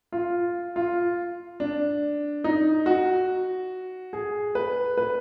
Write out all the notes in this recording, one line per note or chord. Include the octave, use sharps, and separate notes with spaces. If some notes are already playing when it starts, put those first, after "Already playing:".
F4
F4
D4
D#4
F#4
G#4
B4
B4